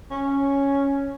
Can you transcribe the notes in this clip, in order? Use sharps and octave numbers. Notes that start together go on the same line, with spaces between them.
C#4